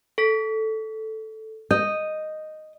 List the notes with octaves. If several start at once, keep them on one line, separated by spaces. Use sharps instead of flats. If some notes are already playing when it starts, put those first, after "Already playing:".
A4 B6
D#5 G6